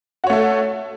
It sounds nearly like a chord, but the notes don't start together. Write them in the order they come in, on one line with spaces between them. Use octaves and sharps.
F#4 C#5 A3 A4